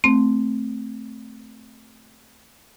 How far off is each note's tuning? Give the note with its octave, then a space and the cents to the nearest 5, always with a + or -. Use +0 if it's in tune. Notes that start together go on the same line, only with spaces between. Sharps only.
A3 +0 C4 +0